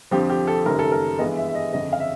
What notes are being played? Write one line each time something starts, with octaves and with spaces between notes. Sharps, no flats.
F2 D3 F3 G4
G4
A4
F#1 F#2 D#3 G3 A#4
A4
A#4
G2 E3 G#3 B3 D#5
E5
E5
D#5
G1 F2 C#3 D#5
F5
E5